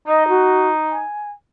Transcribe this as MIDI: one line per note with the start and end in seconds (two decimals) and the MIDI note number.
0.07 1.01 63
0.07 0.28 75
0.29 0.69 66
0.91 1.31 80